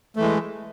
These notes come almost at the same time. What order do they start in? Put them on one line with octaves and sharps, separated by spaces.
A3 E3 G#3